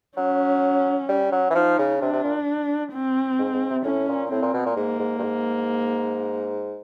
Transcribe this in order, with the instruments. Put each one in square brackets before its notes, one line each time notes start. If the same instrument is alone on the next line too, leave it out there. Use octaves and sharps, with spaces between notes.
[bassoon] F#3 [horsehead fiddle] C#4
[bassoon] G3
F#3
E3
[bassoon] F3 [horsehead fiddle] D#4
[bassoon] C#3
[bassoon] C3 [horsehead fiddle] D4
[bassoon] C3
A#2
[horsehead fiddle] C4
[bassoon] G#2
G#2
C3
[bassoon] A2 [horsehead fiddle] C#4
[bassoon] A#2
[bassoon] A2 [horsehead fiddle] C4
[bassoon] A#2
B2
A#2
[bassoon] G#2 [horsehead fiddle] A#3
[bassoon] G#2
G2
G#2